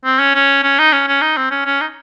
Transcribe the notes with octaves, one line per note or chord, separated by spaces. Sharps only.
C4
C#4
C#4
C#4
D#4
C#4
C#4
D#4
C4
C#4
C#4
D#4